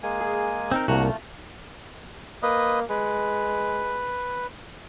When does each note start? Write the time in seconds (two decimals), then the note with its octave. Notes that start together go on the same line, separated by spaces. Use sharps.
0.03 G#3 A#3 G#5
0.21 G#4
0.71 C4 D#4 A#4
0.88 C2 A3 A#3 F#4 A#5
1.05 F4
2.43 A#3 B4 D#5
2.90 G#3 B4